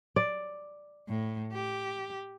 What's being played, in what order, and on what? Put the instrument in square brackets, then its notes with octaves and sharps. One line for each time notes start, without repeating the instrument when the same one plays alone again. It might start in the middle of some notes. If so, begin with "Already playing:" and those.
[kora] D5
[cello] A2
G4